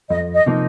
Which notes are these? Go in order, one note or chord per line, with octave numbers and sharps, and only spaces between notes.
F2 D#5
D#5
C3 F3 A#3 D#4